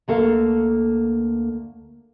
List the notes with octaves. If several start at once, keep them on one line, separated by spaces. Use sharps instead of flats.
D2 A#3 A4 F5